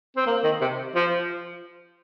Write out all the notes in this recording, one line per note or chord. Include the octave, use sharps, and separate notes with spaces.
C4
A#3
D#3
C3
F3